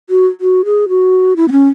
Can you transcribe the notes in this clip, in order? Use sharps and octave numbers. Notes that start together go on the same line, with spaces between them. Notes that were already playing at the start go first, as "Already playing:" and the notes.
F#4
F#4
G#4
F#4
E4
B3
C#4